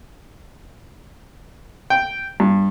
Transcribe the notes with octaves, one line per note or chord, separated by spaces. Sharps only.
G5
G2